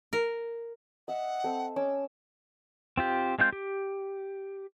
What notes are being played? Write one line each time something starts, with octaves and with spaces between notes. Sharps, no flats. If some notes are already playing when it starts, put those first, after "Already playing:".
A#4
D#5 E5 F#5
C4 A4
C#4 D6 E6
C4 F4 G4
G#3 C4 F4 G6
G4